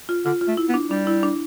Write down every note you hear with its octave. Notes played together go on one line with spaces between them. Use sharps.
F4
D3 F4
F4
A3
E4
B3
D4
G3 D4
E4
D4